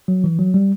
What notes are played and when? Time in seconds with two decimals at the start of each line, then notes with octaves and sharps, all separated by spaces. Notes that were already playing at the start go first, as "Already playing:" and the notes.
0.08 F#3
0.24 E3
0.39 F#3
0.54 G3